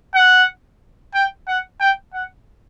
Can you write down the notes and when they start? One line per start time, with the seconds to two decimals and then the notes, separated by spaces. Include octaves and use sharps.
0.15 F#5
1.15 G5
1.48 F#5
1.80 G5
2.14 F#5